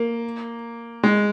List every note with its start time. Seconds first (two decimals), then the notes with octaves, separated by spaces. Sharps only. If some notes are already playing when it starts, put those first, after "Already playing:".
Already playing: A#3
1.04 G#3